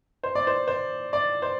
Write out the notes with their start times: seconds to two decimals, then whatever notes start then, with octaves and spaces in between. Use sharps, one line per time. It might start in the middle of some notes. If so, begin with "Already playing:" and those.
0.23 C5
0.35 D5
0.47 C5
0.68 C5
1.13 D5
1.42 C5